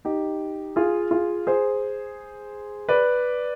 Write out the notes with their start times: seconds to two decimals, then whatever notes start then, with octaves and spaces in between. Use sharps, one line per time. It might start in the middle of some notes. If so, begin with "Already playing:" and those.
0.05 D#4 G4
0.76 F4 G#4
1.11 F4 G#4
1.47 G#4 C5
2.89 B4 D5